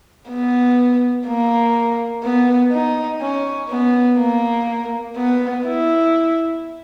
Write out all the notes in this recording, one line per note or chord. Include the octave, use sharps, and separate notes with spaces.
B3
A#3
B3
D#4
C#4
B3
A#3
B3
E4